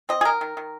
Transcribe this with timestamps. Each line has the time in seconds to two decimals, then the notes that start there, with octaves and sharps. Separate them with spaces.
0.09 C4 D#5
0.21 G#4
0.25 D#3 A#4
0.41 D#3
0.57 D#3